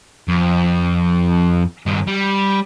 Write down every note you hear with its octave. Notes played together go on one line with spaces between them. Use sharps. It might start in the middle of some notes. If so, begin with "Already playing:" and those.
F2
G2 D#3
G3